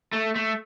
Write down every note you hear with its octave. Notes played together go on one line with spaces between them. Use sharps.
A3
A3